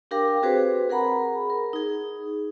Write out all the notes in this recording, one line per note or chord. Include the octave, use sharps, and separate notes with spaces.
D4 G4 A#4 F5 G5 D6
C4 F#4 G#4 B4 C5
G#4 A#4 F#5 A#5 B5
A#4
D#4 G#4